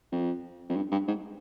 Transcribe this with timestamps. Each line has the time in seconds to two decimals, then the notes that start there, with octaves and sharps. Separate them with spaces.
0.12 F2
0.69 F2
0.76 G2
0.92 G2
1.07 G#2